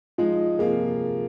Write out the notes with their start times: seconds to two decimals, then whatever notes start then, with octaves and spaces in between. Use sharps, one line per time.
0.18 F3 G#3 D#4 F4
0.59 C3 F3 A#3 F4 G#4